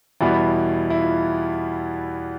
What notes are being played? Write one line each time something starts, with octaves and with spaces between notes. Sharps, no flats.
E2 B2 G3 B3 E4
E4
F4